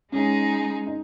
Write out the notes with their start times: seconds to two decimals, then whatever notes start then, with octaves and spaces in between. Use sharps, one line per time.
0.12 G#3 C#4 D#4 G#4
0.86 D#4